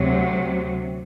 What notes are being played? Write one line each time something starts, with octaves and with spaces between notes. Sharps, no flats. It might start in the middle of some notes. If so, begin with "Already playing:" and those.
Already playing: D2 C3 F#3